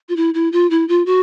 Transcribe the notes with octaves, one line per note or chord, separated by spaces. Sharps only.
F4
E4
E4
F4
E4
F4
F#4